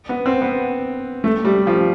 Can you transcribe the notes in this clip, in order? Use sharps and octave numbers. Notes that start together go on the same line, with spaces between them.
B3
C4
B3
A3
G3
F3